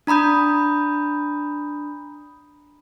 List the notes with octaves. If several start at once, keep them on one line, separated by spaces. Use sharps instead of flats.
D4 A#5 B5 D#6 G6